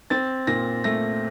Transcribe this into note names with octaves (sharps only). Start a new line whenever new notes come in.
C4 A6
A#2 A#6
A3 A#6